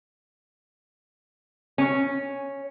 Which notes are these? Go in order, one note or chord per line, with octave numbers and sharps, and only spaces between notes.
C#4